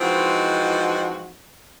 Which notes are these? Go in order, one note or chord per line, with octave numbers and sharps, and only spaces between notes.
E3 F3 G#3 C4 D#4 F#4